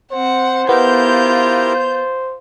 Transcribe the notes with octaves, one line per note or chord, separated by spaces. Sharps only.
C4 C5 F#5
B3 E4 F4 G4 A#4 G6